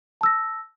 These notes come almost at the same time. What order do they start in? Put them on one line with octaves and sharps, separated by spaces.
A5 E6 A#6